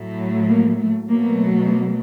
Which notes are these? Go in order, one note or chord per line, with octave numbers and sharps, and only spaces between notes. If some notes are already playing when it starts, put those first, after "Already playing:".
Already playing: A2 F#3 A3
A#3
A3
B2 F#3 A3 A#3
A#3